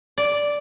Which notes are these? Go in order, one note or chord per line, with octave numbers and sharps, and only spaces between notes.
D5